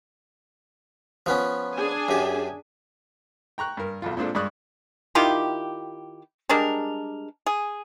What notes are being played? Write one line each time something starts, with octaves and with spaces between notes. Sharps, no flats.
F3 B3 C#4
D4 G#4 G#5
F#2 G4
G5 A#5 C#6 F#6
G2 A#4
B1 F2 F4
A#2 G#3 C4 D4 F4 A4
G2 G#3 D5 C#6 D#6 F#6
D#3 E4 F4 G4
G3 G#3 D4 A#4
G#4